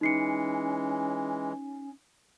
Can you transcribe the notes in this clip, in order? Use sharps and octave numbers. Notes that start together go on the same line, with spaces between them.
E3 G#3 C#4 D#4 C7 C#7